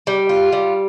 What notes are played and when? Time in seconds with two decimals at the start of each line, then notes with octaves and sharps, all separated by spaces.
0.07 G3
0.29 F4
0.52 G3